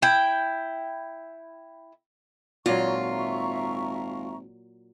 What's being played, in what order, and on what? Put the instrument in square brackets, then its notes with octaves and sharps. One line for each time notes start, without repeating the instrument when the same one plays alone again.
[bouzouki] E4 G5
[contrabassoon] G#1 [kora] A#2 F#3 [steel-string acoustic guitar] F4 [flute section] E5 A#5 C#6